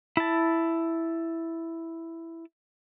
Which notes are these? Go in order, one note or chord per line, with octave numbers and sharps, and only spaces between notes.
E4 A5